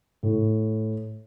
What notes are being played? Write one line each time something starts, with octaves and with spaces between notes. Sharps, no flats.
A2